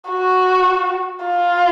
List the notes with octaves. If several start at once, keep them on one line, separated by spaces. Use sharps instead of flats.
F#4
F4